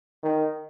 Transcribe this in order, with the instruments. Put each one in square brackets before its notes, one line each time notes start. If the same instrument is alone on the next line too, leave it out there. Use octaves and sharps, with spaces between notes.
[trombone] D#3